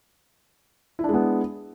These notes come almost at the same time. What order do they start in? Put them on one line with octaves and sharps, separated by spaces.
E4 D4 G#3 B3